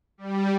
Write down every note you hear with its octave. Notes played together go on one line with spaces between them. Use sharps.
G3